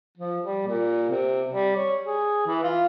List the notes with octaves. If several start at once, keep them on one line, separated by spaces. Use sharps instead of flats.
F3
G3
A#2
C3
G3
C#5
G#4
E3
F4